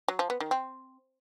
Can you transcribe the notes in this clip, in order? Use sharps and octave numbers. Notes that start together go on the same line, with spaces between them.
F#3
F3
B3
D#3
C4